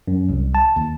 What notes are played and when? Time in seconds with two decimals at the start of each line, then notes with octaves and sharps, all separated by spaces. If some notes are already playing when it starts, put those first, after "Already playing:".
0.08 F#2
0.29 C2
0.55 A5
0.76 D#2